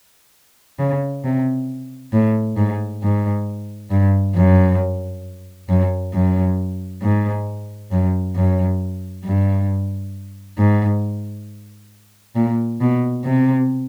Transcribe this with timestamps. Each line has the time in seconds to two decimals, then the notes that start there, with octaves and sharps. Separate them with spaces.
0.79 C#3
1.24 C3
2.13 A2
2.57 G#2
3.02 G#2
3.91 G2
4.35 F#2
5.69 F#2
6.14 F#2
7.02 G#2
7.91 F#2
8.35 F#2
9.24 G2
10.58 G#2
12.35 A#2
12.81 B2
13.25 C3